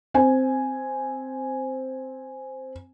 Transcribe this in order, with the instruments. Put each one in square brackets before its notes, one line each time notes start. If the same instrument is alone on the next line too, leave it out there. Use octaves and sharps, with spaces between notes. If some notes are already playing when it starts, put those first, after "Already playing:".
[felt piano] C4 G#5